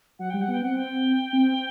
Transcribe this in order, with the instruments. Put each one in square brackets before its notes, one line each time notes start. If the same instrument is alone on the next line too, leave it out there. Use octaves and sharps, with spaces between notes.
[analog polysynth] F#3 [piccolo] F#5
[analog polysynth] G3 [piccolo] G5
[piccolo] F#5
[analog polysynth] B3 [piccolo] G5
[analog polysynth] C4 [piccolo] F#5
[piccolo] G5
[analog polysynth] C4